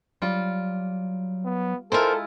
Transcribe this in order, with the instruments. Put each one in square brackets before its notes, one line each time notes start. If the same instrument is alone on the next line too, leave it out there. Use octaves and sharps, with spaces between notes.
[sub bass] F#3 [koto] G3 F4
[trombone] B3
[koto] G#3 E4 F4 [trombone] A4 [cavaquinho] A#4 C5